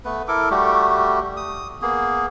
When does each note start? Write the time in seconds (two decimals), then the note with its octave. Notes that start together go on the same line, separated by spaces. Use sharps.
0.05 A3 B3 B4
0.28 E4 A4 A#4 D6
0.51 G3 A3 F#4 G4
1.37 D#6
1.82 A#3 B3 G#4